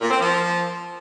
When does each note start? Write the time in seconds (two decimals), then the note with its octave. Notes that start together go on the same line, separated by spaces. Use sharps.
0.01 A#2
0.10 C4
0.19 F3